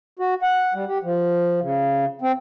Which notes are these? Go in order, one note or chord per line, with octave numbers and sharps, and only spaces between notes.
F#4
F#5
G3
G4
F3
C#3
C4